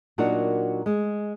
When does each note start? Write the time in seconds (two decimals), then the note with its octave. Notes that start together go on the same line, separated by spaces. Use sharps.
0.18 A#2 F#3 D4 D#4 F#4 A#4
0.86 G#3